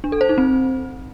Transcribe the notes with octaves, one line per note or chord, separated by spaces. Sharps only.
D4
A4
C5
D#4
C4